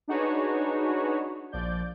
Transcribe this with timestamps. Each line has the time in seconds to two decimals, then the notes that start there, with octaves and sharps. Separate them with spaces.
0.08 D4 D#4 F#4 G#4 B4 C#5
1.52 A#1 F3 D5 G6